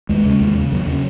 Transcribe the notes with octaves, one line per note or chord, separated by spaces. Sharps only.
D#2 G#3
C#3
D#2
C#3
D#2 F#3
C#3